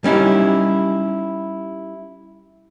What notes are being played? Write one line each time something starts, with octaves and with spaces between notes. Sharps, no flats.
G3 C#4 D#4 E4 G4